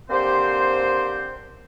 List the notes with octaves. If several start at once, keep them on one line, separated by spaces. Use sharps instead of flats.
D3 A#3 C4 G4 C5